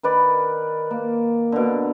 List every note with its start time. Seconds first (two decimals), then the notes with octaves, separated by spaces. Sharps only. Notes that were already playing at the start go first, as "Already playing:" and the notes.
0.03 D#3 B4 D5
0.91 A#3
1.52 B2 D3